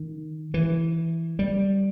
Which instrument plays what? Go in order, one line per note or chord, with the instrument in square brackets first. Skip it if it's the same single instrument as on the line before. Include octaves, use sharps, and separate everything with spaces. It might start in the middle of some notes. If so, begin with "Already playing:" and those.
Already playing: [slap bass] D#3
E3
G3